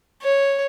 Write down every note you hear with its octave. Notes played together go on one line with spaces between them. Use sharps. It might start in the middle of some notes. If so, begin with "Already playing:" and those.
C#5